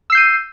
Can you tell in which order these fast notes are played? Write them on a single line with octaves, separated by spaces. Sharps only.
E6 C7 G6 D#7